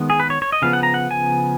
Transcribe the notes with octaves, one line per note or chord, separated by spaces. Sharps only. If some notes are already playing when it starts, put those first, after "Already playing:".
Already playing: D#3 G#3 B3
G#4
B4
C#5
C#5
D#5
C#3 F3 B3 F5
F#5
A#5
F#5
G#5